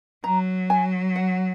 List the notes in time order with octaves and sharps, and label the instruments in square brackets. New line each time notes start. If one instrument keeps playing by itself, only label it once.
[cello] F#3 [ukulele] A#5
[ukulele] G#5
F#5